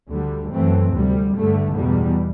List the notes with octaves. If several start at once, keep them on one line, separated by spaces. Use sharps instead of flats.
D2 D3 G3
F#2 E3 A3 C4
D2 C3 G3
G2 D3 A3
E2 B2 G3